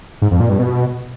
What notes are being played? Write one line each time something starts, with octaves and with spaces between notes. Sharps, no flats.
G#2
F2
A#2
G2
B2